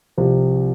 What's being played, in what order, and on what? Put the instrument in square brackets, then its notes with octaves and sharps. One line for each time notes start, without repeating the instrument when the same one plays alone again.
[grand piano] C2 C3 F3